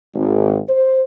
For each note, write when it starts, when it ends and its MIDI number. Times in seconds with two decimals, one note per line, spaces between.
0.15 0.59 32
0.68 1.01 72